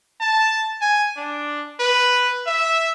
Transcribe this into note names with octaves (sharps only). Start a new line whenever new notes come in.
A5
G#5
D4
B4
E5